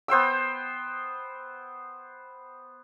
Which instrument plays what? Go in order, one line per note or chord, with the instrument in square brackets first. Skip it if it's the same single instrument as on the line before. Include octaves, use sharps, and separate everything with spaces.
[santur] B3 C5 G5 E6